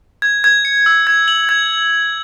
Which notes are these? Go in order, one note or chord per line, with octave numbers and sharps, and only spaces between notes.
G#6
G#6
C#7
E6
G#6
F#7
G#6